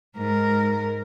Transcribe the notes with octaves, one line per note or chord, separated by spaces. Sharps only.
G#2 A#4